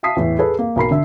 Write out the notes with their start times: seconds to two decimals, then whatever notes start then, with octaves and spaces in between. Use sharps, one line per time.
0.03 E5 F5 A5 D#6 B6 C7
0.17 E2 A2
0.39 G#4 A4 B4
0.59 A#3
0.76 B1 A#4 B5 C7
0.91 D3 E5